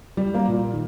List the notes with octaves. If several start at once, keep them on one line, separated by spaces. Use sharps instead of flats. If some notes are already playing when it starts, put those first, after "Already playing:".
G3
A#3
A#2
D#3